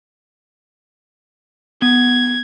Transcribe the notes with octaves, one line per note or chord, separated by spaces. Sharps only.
B3 G#6